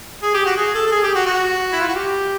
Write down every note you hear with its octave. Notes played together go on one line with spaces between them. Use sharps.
G#4
G4
F#4
G#4
A4
A4
G#4
G4
F#4
F#4
E4
F4
F#4
G4